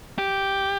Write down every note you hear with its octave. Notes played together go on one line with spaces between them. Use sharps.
G4